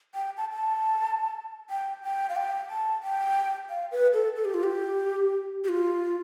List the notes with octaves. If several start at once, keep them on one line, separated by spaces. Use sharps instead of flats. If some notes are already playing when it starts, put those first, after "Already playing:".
G5
A5
A5
G5
G5
F5
G5
A5
G5
F5
B4
A4
A4
G4
F4
G4
G4
F4